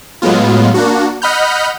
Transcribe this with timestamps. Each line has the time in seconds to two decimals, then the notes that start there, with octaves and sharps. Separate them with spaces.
0.22 A2 F#3 G#3 B3 F4
0.74 A#3 D4 F#4
1.22 D#5 F#5 B5 F6 G6